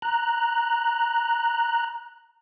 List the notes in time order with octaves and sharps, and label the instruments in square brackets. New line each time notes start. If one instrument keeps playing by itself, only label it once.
[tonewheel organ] A#5 F#6